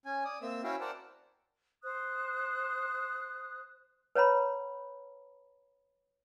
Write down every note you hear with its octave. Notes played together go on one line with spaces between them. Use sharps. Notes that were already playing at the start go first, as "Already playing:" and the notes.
C#4 G#5
D5 D#6
A#3 C4 E5 E6
C#4 E4 F#4 E5 F5 G5
A#4 C5 D5 F#5 G5 A5
C5 D#6 F#6
B4 C#5 F#5 A#5 B5